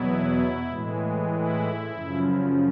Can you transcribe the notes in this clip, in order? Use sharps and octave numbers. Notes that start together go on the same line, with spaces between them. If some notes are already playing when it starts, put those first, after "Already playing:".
Already playing: E2 B2 F#3 B3 E4
A2 E3 G#3
E4
F#2 C#3 F3